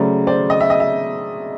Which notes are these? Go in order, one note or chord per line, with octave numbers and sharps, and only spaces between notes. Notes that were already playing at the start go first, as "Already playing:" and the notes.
Already playing: C#3 F#3 A3 C5 D5
C5 D5
D#5
E5
D#5
E5